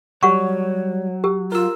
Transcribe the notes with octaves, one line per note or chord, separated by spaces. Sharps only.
F#3 G3 G4 C#5 F#5 C#6
G4
F4 A#4 E6